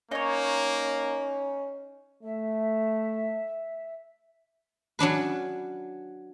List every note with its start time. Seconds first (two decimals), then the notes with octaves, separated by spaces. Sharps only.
0.11 A#3 C#4 D#4 C#5
2.23 A3 E5
4.99 F#3 C#4 D4 B4